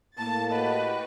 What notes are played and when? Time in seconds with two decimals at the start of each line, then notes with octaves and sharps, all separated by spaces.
0.18 A2 A#3 A5 A6
0.51 F#4 G4 B4 D#5